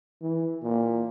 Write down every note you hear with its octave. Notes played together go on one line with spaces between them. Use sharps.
E3
A#2